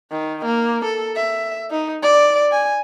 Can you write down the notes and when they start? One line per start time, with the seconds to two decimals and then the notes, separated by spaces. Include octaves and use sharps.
0.12 D#3
0.45 A#3
0.85 A4
1.16 E5
1.71 D#4
2.03 D5
2.52 G#5